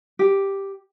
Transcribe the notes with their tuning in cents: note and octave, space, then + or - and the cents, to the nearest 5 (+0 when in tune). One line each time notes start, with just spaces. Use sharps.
G4 +0